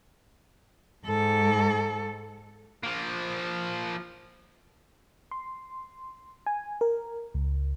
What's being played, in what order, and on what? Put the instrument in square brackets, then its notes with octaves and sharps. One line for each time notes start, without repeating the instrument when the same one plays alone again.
[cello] G#2 A4
[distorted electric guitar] F3 A#3
[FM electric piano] C6
G#5
A#4
C#2